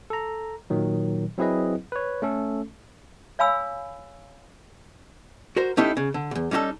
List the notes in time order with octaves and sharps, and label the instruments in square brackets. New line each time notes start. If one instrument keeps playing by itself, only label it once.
[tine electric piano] A4 A#5
A#2 D#3 F#3
F#3 C4 E4 G#4 B4 D#5
B4 C#5
A3 C#4 A4
[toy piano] C#5 F5 G#5 B5 E6
[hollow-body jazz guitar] F#4 A#4 C5
A3 C#4 D#4 E4 G4
C#3
D3
B1 E2
G3 C#4 D#4 F#4 A4